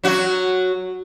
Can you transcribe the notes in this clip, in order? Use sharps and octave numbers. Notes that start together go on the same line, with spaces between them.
F#3 F#4